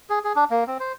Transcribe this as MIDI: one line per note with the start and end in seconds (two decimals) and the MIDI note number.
0.10 0.19 68
0.24 0.33 68
0.36 0.44 62
0.50 0.64 58
0.67 0.78 60
0.80 0.93 72